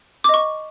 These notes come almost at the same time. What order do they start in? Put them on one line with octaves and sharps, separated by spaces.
D6 D#5 C#6